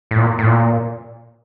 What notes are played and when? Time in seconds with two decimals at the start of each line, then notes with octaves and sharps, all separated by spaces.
0.11 A2
0.18 A#2
0.39 A2
0.47 A#2